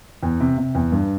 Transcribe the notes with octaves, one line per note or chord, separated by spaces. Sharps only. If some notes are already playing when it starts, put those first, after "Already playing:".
E2
C3
C3
E2
G2